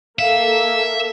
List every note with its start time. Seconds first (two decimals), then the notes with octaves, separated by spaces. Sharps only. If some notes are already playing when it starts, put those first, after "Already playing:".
0.19 A#3 A4 E5 F5